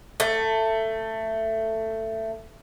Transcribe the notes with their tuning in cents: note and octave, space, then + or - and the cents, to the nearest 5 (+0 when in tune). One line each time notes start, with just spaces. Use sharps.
A3 +15